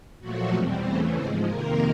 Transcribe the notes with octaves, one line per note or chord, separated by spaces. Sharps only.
A#2 F3 F#3 A3 F#4
E2 B2 G3 C4
E2 C#3 E3 A3 C4 C5
G#2 F3 G#3 C4 C5
F2 C3 D#3 A#3 A#4